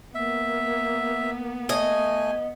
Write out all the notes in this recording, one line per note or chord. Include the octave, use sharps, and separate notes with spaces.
A#3 B3 E5
A3 D#5 G#5